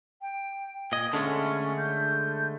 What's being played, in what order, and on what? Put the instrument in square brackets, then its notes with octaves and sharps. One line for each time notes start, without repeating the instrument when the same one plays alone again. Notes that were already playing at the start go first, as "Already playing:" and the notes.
[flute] G5
[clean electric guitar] A#2 D#5 [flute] G#6
[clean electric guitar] D3 G#3 A3 [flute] C#4
[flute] G6